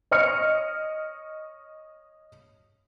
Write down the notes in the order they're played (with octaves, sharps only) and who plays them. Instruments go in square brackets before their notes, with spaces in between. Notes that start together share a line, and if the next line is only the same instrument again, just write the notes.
[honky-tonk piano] C#5 D#5 F6 C#7